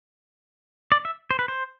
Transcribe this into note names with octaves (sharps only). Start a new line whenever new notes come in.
D5
E5
C5
B4
C5